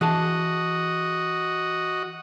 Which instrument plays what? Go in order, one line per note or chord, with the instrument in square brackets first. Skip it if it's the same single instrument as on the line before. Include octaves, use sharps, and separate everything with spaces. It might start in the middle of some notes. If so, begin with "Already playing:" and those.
[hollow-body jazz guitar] E3 G#4 A5 [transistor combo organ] F#4 D#5